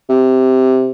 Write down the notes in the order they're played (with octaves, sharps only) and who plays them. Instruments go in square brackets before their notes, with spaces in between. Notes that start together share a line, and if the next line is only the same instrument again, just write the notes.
[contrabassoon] C3